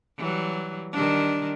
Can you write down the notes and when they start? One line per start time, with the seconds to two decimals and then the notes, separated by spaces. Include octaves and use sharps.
0.18 E3 F#3 G3
0.92 D#3 G3 D4